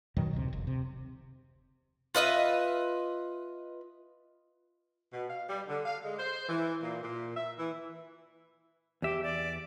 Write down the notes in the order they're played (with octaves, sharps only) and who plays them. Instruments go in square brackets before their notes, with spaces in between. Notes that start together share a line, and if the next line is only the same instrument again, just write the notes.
[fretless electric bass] F#2 B2 D#3 F#3
D1 D2 C3
F1
C3
[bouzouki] F4 B4 D#5 E5
[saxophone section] B2
F5
G3
D3
F5
G#3
C5
E3
A#2
A#2
E5
E3
[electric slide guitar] E2 E5 [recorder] G4
[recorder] D5